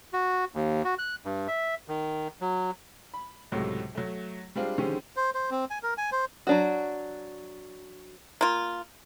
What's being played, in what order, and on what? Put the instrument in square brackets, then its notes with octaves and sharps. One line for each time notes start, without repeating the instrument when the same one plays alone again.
[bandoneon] F#4
D#2
F#4
F#6
G2
E5
D#3
F#3
[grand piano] B5
C#2 A2 C3 F#3 A3
F#3 A3
G3 G#3 C4 D4 F4
D3 D#3 F3 G#3 C#4 G4
[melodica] C5
C5
C4
G#5
A#4
G#5
C5
[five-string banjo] F#3 D4 F#4
[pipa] A#3 F4